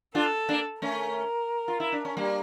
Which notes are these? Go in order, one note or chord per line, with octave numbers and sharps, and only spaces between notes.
D4 F4 A4
A#3 D4
A3 C#4 A#4
F4
E4
D4
C#4
G3 A#3